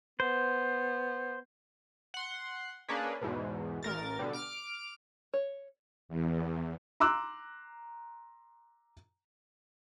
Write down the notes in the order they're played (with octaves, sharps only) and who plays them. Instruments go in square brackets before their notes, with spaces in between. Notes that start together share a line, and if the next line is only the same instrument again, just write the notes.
[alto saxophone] B3 [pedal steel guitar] C5
[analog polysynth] F#5 C6
A#3 C#4 D4 G#4 B4
E2 G#2 B2
A1 A#4 A6
B2 D3 G3
D6 F6 D7
[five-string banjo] C#5
[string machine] E2
[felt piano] A#5 C6 D6 E6 F#6